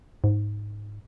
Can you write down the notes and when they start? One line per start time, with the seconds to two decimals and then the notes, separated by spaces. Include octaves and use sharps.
0.24 G#2